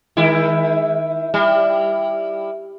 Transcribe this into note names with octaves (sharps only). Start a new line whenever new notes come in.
D#3 G#3 E4
G3 E4